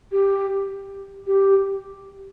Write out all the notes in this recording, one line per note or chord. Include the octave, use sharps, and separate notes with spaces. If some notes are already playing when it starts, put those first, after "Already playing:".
G4
G4